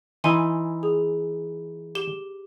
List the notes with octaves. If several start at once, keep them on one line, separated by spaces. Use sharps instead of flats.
E3 D#4 E4 G#5 C6
G#4
G4 E7 G7